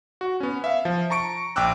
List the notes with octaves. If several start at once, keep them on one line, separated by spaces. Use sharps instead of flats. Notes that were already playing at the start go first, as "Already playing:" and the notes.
F#4
B3 C#4
E5 F5
F3
A5 A#5 C#6 C#7 D7
A#1 G5 D6 E6 F#6